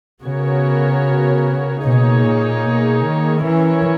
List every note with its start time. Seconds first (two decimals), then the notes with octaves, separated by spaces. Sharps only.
0.24 C#3 B3 F#4 A#4 C#5
1.83 B2 A#3 D#4 G#4 C#5
2.23 A#2
2.64 B2
3.03 D#3
3.43 E3 C#4 E4 A#4 C#5